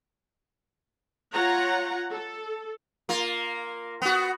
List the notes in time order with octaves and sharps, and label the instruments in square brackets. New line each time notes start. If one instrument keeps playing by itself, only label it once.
[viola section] F4 C#5 F#5 A#5
A4
[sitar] A#3 F4
B3 F#4